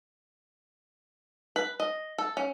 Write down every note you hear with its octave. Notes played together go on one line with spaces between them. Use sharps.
B4
D#5
A4
C#4